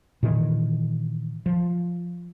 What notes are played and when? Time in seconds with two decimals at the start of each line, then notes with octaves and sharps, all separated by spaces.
0.23 A#2 D#3 E3
1.46 F3